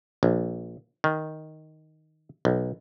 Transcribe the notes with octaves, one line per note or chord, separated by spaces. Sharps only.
A#1
D#3
B1